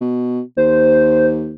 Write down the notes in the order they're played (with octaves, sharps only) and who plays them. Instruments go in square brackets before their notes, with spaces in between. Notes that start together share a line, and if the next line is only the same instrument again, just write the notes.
[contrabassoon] B2
[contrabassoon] D#2 [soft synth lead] C5